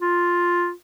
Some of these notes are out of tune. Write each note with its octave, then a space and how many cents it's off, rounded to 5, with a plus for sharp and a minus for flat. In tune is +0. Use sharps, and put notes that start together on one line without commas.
F4 +5